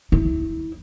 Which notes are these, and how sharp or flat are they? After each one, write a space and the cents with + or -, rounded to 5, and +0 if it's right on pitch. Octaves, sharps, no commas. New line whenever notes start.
E4 -25